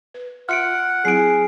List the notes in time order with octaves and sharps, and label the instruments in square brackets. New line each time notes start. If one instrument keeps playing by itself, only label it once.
[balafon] B4
[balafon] F4 E5 C6 [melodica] F#5 [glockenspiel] F6 C#7 D7
[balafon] F#3 C4 E4 [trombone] G#4 [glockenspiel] C7 D7